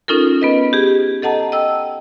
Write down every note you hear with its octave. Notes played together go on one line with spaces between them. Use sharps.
C#4 D#4 F4 A4 A#4
B3 B4 D#5
G4 G#4
A4 D#5 F#5 A5 A#5
D#5 G5 E6